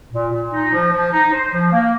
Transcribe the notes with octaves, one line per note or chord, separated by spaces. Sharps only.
A#2
A#2
D#4
F3
F3
D#4
C5
F3
A#3